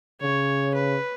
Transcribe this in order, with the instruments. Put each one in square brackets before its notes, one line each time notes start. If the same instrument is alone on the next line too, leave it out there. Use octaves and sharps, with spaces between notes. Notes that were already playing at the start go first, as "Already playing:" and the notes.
[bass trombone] C#3 [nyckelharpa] C#5
[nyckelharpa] B4